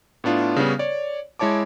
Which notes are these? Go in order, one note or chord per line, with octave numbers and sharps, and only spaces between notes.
A2 B3 D4 F4
C#3 G3 B3 C#4
C#5 D5
G#3 E4 C#5 A5 D6